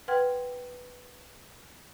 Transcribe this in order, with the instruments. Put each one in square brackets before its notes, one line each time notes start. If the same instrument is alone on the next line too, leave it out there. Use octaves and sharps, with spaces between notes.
[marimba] B4 F#5 G5 C6 F6 G#6